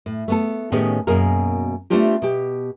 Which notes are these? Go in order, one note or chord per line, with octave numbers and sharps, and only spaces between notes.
A2
A3 B3 A4
A2 D#3 B3 C#4 G4 G#4
F#2 B2 A#3 G#4 A#4
A3 B3 C4 D4 F4 G4
B2 G4